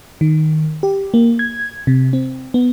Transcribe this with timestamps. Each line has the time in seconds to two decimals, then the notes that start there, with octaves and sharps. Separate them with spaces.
0.21 D#3
0.83 G4
1.14 A#3
1.39 G#6
1.87 C3
2.13 C4
2.54 B3